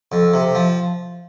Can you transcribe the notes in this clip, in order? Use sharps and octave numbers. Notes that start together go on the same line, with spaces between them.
F2
C3
F3